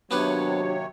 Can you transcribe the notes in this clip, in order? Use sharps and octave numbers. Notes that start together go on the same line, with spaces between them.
D#2 C3 F#3 B3 D4 G4 B4 C#5